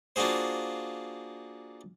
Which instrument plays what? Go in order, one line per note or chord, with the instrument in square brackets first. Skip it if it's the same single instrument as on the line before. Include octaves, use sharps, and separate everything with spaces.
[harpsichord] A#3 D4 F4 F#4 G#4 C5